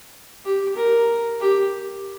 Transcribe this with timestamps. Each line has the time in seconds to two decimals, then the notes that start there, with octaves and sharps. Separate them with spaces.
0.45 G4
0.76 A#4
1.40 G4